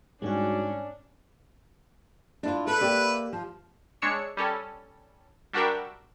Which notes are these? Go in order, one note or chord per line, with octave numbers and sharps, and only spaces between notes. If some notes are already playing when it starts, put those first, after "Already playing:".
G#2 G3 G#3 C#4 D4 F#4
D4 E4 F4
A4 B4 E5
A#3 G4 D5
F3
G#3 D4 C#5 E6 C#7
G3 C#4 A4
G3 D4 F#4 G4 A#4 E5